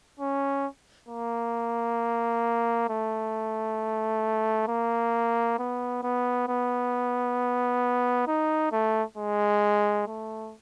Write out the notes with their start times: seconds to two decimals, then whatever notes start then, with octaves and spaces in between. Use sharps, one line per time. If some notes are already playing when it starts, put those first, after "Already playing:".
0.20 C#4
1.09 A#3
2.89 A3
4.68 A#3
5.59 B3
6.03 B3
6.48 B3
8.28 D#4
8.72 A3
9.18 G#3
10.07 A3